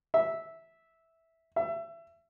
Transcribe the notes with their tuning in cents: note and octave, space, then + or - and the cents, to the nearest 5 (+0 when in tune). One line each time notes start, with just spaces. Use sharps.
E5 -10
E5 +25